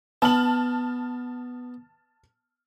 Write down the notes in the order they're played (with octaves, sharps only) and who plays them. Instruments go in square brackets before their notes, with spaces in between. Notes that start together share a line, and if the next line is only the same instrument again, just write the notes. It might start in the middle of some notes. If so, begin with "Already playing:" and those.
[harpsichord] B3 [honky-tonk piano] A5 F6 F#7